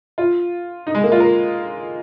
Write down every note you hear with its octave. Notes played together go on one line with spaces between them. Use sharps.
F4
D#4
G#3
A#3
F4
A#4